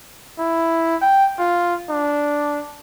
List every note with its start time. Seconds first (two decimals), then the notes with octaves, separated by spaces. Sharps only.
0.39 E4
1.02 G5
1.39 F4
1.90 D4